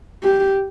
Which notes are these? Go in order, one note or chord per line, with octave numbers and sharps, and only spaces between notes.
G4